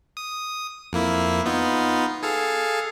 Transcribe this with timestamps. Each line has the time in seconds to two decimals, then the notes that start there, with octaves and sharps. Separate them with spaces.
0.17 D#6
0.93 F2 A#3 E4
1.46 B3 D#4 F4
2.23 G#4 A4 F5